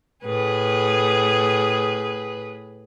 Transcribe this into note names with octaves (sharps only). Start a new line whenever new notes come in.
A2 G#4 B4